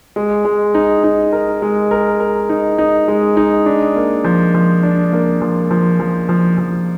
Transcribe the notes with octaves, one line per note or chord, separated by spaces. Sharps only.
G#3
G#3
D#4
D#4
A#4
G#3
A#4
A#4
D#4
D#4
G#3
D#4
D4
A#3
F3
F3
D4
A#3
F3
F3
F3
F3
F3